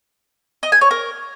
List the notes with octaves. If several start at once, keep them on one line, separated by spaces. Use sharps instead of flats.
D#5
G#5
C#5
A#4